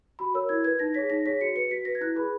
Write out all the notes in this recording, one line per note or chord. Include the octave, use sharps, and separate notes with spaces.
F#4 B5
A#4 C#5 E6
E4 G#6
B4 G#6
D#4 A#6
G#4 C#5 B6
D#4 A#6
G#4 C#5 B6
F#4 C#7
B4 C#7
F#4 B6
B4 A#6
G#6
E4 F#6
G#4 B4 B5